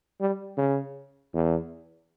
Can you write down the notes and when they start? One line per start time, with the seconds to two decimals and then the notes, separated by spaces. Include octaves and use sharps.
0.20 G3
0.58 C#3
1.34 E2